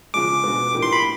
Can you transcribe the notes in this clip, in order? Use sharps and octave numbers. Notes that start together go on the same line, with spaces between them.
C#3 F3 G#3 D6
B2 G#3 B3 D4 F#4
A2 F3 A#3 D4 G4
C6
B5